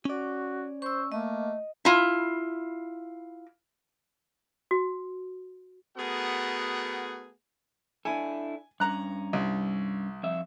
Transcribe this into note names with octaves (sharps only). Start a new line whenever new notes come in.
C#4 F#4 D5
C5 C#6 E6
A3 A#3 D#5
E4 F4
F#4
A3 B3 F#4 G#4 A#4 F#5
D4 E4 A4 G#5
G2 C#4 A#5 F#6
C2
F2 E5